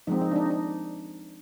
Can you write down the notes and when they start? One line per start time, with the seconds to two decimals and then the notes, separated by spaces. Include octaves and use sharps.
0.07 F3 G#3 C4 D#4
0.21 D#4
0.31 D4
0.36 D#4
0.46 D4
0.50 D#4